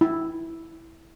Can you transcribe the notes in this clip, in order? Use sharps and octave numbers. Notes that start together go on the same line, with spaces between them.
E4